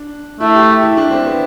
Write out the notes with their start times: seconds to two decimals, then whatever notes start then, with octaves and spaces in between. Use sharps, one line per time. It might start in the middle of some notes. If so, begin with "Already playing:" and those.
Already playing: D4
0.40 A3 E4
0.55 G4
0.82 E4
0.97 D4
1.11 C4
1.26 B3